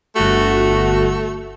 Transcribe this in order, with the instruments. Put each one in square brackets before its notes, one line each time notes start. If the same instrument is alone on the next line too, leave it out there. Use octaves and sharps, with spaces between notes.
[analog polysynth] G1 F#4 [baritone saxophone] A3